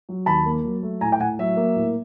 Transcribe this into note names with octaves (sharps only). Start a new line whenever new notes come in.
F#3
D#2 A5 B5
A#3
F#3
A3
A2 G#5 A#5
G5
A2 F#5 G#5
F#3 E5
A#3
A2